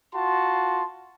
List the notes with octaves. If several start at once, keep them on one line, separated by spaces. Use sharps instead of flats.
F4 F#4 A5 C6